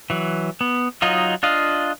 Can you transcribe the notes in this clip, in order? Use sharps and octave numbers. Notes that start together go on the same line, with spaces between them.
E3 F#3
B3
F#3 D#4 F4 D#5
D4 F4 D#5 F5